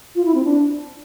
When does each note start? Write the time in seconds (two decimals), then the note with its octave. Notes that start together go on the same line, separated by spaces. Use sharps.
0.16 F4
0.25 E4
0.35 C4
0.44 D4